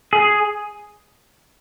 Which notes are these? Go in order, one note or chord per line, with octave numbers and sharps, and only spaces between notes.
G#4